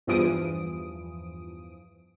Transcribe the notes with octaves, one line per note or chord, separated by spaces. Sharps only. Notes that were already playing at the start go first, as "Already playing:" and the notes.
E2 G2 E3 F3 D#6 D7